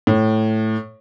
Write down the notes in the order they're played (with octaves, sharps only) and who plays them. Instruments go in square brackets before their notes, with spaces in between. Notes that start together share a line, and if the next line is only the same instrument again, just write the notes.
[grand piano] A2